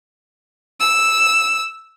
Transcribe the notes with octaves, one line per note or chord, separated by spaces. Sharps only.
E6